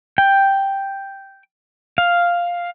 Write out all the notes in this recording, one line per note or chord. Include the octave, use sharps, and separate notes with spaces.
G5
F5